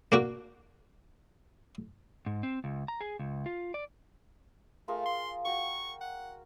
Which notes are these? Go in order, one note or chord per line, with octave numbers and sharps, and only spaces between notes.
A#3 D4 F#4
G#2
C4
C#2
A#5
G#4
C#2
F4
D5
A3 F4 G#4 A#4
C6
F#4 G5 C#6
F#5